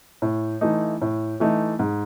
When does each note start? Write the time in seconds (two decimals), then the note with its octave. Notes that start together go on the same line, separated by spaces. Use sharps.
0.22 A2
0.61 E3 A3 D#4
1.02 A2
1.40 E3 A3 D#4
1.79 G#2